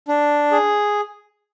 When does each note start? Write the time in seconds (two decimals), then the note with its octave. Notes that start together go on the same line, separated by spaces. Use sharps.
0.08 D4
0.52 G#4